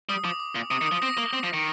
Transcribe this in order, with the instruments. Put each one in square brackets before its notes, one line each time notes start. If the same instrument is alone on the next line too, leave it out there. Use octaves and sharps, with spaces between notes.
[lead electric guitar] G3 [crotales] D#6
[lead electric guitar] F3 [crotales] D6
[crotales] D6
[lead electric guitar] A#2
[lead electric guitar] C3 [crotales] D#6
[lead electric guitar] D#3
[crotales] D#6
[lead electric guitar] F3
[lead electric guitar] C4 [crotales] A#6
[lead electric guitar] A#3
C4
F3
D#3